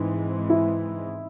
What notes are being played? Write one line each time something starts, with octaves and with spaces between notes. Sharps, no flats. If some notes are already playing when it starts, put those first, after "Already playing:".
Already playing: G#2 E3 G#3 C4 D#4
E4